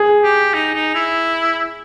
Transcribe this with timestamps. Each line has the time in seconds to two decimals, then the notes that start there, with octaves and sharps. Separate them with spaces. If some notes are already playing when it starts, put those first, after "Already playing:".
Already playing: G#4
0.24 G4
0.54 D#4
0.75 D#4
0.95 E4